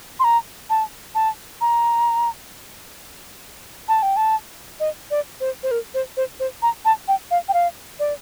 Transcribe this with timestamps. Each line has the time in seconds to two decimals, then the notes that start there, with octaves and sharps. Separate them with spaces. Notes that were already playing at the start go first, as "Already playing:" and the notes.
0.20 C6
0.24 A#5
0.70 A5
1.15 A5
1.61 A#5
3.89 A5
4.03 G5
4.17 A5
4.80 D#5
5.11 D5
5.41 C5
5.63 C5
5.71 A#4
5.94 C5
6.17 C5
6.40 C5
6.62 A#5
6.85 A5
7.08 G5
7.31 F5
7.49 G5
7.54 F5
8.00 D5